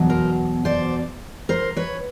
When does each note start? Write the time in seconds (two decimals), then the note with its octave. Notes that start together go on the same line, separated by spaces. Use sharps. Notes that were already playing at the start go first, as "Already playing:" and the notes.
Already playing: E2 B2 F#3
0.10 A#4 C5
0.65 C5 D5
1.49 A#4 C5
1.77 B4 C#5